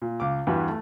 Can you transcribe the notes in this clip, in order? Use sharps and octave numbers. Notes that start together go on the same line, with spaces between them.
A#2
C#2 D6
E2 G2 E3 F#4 G4 B4
A3